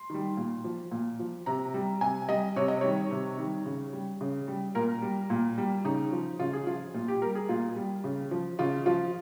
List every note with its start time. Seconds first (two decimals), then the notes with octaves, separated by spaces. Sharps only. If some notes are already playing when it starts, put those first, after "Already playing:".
Already playing: C6
0.10 D#3 G3
0.37 A#2
0.64 F3
0.91 A#2
1.19 F3
1.46 C3 A#5
1.74 G3
2.01 C3 G#5
2.29 G3 D#5
2.56 C3 C#5
2.68 D#5
2.81 D#3 G3 C#5
3.11 C3
3.38 D#3 G3
3.66 C#3
3.93 G3
4.21 C#3
4.48 G3
4.75 A#2 A#4
5.02 G3
5.30 A#2
5.58 G3
5.85 C#3 D#4
6.12 F3
6.39 C#3 F4
6.53 G#4
6.67 F3 F4
6.94 A#2 F4
7.08 G4
7.22 G3 A#4
7.35 G#4
7.49 A#2 F4
7.76 G3
8.04 C#3
8.31 F3
8.59 C#3 F4
8.86 F3 F4